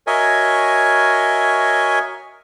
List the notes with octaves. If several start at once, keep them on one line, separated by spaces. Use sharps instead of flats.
F#4 A#4 C#5 D#5 E5 G#5